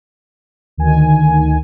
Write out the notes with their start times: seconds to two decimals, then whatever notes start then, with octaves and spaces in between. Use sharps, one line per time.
0.77 D2 D#3 G#5